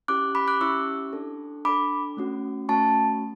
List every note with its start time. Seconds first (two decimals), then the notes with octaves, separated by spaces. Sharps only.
0.08 C#4 E4 G4 D6 F#6
0.35 B5 D6
0.48 D6 F#6
0.61 C#4 E4 G4 C#6 E6
1.13 D4 A4
1.65 D4 A4 B5 D6
2.17 A3 C#4 F#4
2.69 A3 C#4 F#4 A5 C#6